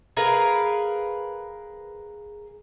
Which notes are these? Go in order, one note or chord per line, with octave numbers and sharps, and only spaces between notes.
G#4 A#4 B4 F5